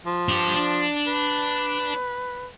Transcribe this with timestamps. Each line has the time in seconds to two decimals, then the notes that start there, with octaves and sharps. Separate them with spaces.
0.05 F3
0.29 D4 G4
0.54 D4
1.07 B4